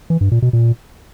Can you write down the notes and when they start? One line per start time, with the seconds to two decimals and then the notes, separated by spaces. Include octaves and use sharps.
0.10 E3
0.21 G2
0.32 A#2
0.42 B2
0.53 A#2